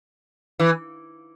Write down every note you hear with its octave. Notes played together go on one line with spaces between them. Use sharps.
E3